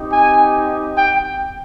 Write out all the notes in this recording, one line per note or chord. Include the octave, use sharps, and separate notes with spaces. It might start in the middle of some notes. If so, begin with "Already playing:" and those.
Already playing: C4 D#4 G4
G#5
G5